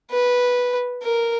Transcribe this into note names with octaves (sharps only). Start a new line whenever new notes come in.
B4
A#4